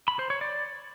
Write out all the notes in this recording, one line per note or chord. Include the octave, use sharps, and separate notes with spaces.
B5
C5
C#5
D5